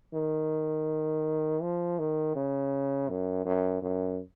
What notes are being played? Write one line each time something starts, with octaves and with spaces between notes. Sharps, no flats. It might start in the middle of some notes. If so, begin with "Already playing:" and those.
D#3
F3
D#3
C#3
F#2
F#2
F#2